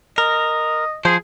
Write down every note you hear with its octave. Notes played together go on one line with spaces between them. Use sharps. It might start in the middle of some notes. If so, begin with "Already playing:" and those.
A#4 D#5
F3 G#4 C5